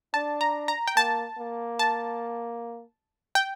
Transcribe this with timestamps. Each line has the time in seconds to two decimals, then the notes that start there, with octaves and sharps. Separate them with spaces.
0.14 D4 A5
0.41 A#5
0.68 A#5
0.88 G5
0.96 A#3 A5
1.38 A#3
1.79 A5
3.35 G5